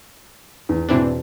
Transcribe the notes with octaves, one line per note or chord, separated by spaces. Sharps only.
E2
E2 B2 E3 C4 D4